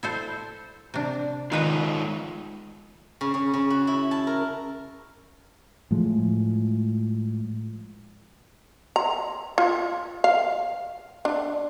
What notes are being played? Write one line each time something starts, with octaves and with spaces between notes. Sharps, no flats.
E4 A4 C5
C3 D4
D#3 G#3 D#4 F4 B4 D#5
C#3
C#3
C#3
F#4
E4
A5
A#4
A2 F3 G#3
A#5
F4
F5
D4